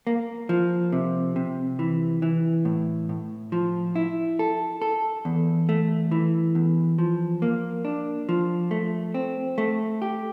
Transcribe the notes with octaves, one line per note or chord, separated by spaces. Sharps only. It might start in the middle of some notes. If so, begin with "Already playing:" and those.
A#3
F3
C3
C3
E3
E3
A2
A2
F3
E4
A4
A4
E2
A3
E3
E2
F3
A#3
D4
F3
A3
C4
A3
G4